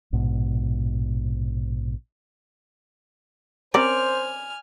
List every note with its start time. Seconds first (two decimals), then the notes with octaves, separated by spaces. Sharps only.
0.13 A#1 G#2 B2
3.74 C4 C#4 A#4 C5 D5 G#5 F6